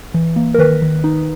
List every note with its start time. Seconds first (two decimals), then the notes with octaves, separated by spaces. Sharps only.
0.14 E3
0.36 A#3
0.54 A#4
0.59 D#3 B4
0.82 D#3
1.04 D#4